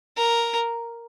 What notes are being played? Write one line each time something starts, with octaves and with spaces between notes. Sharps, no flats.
A#4